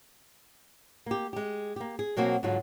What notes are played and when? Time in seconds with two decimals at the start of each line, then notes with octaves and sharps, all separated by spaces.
1.06 A#3 G4
1.33 G#3 G4
1.76 A#3 G4
1.99 G#4
2.17 B2 F#3 A#3 C4 F#4 G#5
2.43 G#2 D3 F#3 F4